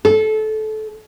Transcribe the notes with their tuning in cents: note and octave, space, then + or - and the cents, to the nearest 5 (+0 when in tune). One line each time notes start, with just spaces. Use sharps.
A4 -20